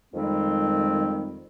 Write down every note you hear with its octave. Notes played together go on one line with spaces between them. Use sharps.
F2 D#3 G3 G#3 C4